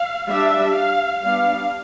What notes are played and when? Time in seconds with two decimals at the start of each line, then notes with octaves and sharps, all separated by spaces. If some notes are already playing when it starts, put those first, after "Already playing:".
Already playing: F5
0.29 G3 D4 E5
0.76 F5
1.22 G3 B3 D4 F5